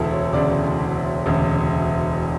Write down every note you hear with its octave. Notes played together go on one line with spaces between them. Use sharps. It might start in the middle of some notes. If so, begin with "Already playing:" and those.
Already playing: E1 D2 C#3 E4 A4
C#5
E1 D2 C#3 D5
E1 D2 C#3